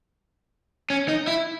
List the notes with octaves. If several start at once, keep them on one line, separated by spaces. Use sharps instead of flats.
C#4
D#4
E4